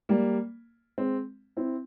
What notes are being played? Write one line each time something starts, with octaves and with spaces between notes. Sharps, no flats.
G3 A#3
G#3 C4
C4 E4